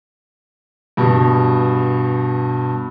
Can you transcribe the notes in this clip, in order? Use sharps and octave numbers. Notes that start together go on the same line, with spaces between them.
G2 B2